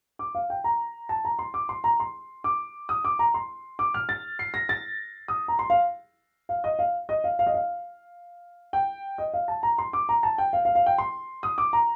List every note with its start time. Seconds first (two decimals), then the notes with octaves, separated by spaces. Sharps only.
0.19 D6
0.35 F5
0.50 G5
0.64 A#5
1.09 A5
1.25 A#5
1.39 C6
1.54 D6
1.69 C6
1.84 A#5
2.00 C6
2.44 D6
2.89 D#6
3.05 D6
3.19 A#5
3.34 C6
3.79 D6
3.94 F6
4.09 A6
4.39 C7
4.54 A#6
4.69 A6
5.28 D#6
5.48 A#5
5.59 C6
5.70 F5
6.49 F5
6.64 D#5
6.79 F5
7.09 D#5
7.24 F5
7.39 F5
7.47 D#5
7.54 F5
8.73 G5
9.18 D#5
9.34 F5
9.48 A5
9.63 A#5
9.78 C6
9.93 D6
10.09 A#5
10.23 A5
10.38 G5
10.53 F5
10.65 F5
10.75 F5
10.86 G5
10.98 C6
11.43 D#6
11.58 D6
11.73 A#5